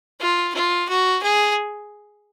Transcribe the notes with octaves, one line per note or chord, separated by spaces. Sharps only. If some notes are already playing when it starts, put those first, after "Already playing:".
F4
F4
F#4
G#4